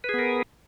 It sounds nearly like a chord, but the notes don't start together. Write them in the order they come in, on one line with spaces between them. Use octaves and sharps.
B4 G#4 B3 A#4